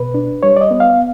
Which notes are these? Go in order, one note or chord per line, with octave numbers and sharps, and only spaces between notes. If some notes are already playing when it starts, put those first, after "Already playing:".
Already playing: B2 B4
D4
G3 C#5
D5
D#5
B3
F5